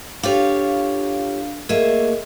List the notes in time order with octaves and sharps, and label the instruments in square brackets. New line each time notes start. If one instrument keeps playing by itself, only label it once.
[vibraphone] D4 A4 F5 [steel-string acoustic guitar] F4 G4 C#5
[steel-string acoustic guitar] A3 A#3 [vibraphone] G#4 D#5 E5